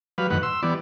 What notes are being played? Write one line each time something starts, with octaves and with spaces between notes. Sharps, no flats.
F#3 G3 B4 F5
F#2 A2 D#3 B4 F#5
C6 E6
E3 G3 B3 D5